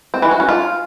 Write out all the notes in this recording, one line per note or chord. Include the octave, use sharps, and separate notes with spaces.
C4
E3
F#4
C#4
F4